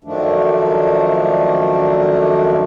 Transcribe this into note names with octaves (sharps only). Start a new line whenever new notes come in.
F#2 D#3 F3 A3 D4